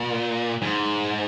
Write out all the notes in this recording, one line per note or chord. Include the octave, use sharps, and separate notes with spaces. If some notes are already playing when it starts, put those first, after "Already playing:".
Already playing: A#2
G#2